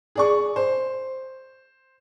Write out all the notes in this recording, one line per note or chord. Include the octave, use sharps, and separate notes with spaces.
G#4 D5 C#6
C5